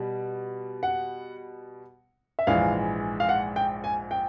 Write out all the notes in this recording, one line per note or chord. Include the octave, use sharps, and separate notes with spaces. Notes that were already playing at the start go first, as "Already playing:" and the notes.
Already playing: B2 G3
F#5
E5
A#1 G#2 E3 G#3 F5
F5
F#5
G5
G#5
G5